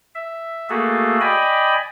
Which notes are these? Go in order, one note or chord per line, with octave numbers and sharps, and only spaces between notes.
E5
A3 A#3 F#4 G#4 A4
D5 D#5 G5 G#5 B5